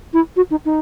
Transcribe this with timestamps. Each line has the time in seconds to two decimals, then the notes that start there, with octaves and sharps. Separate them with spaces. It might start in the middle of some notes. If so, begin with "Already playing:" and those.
0.13 E4
0.36 F#4
0.51 D#4
0.65 D#4